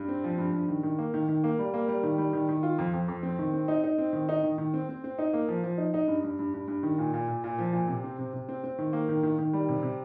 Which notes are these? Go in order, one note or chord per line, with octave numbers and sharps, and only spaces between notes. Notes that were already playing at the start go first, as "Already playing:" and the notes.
Already playing: G2
C4
F3
G2
G2
D#3
D#3
A#3
D#3
D#3
A#3
G3
A#3
G3
D#3
G3
D#3
D#3
F4
F2
F2
F2
C4
D#3
C4
D#4
D#4
C4
D#3
D#4
D#3
D#3
C4
C4
C4
D#4
A#3
F3
F3
D#4
D#4
G2
G2
G2
G2
G2
D#3
A#2
A#2
A#2
A#2
F3
A#2
C3
C4
C3
C3
C4
C4
D#3
A#3
D#3
D#3
D#3
G3
C3
C3